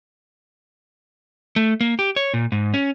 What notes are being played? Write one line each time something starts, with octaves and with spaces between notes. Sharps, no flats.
A3
A#3
G4
C#5
A#2
G#2
C#4